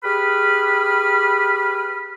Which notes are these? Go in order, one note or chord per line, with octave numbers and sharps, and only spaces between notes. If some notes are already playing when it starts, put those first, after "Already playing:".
G4 G#4 B4 B5 F6